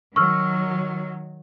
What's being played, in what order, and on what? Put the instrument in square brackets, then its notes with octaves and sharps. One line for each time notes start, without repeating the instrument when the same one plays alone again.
[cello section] D#3 F#3 [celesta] C#6 E6 F6